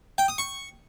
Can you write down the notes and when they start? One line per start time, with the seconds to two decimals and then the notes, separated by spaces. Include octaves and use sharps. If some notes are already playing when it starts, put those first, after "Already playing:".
0.18 G5
0.28 D#6
0.38 C#6